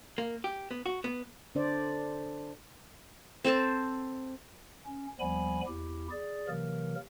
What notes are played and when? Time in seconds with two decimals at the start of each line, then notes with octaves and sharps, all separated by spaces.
0.18 A#3
0.44 G4
0.71 B3
0.86 F#4
1.04 B3
1.55 D3 D4 C5 D5
3.44 C4 A4 C5 A5
4.86 C#4
5.20 D#2 F3 G3 B3 G#5 B5
5.67 E2 E4 G4
6.10 G#4 D5
6.48 C3 E3 F#3 A#3 A#4